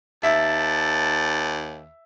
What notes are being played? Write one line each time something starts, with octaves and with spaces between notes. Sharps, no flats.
D#2 E5 A5